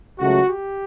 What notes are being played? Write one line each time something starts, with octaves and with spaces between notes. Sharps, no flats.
C#2 C#3 F#3 A3 F#4
G4